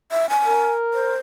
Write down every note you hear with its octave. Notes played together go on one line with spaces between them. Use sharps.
E5
G#5
A#4
C5